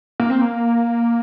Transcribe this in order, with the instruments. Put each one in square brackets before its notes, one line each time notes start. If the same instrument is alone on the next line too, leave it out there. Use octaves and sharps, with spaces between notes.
[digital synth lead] A#3
C4
A#3